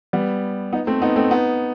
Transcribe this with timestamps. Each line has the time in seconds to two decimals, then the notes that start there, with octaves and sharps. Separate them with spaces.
0.13 G3 B3
0.72 B3 D#4
0.87 A3 C4
1.02 B3 D#4
1.16 A3 C4
1.30 B3 D#4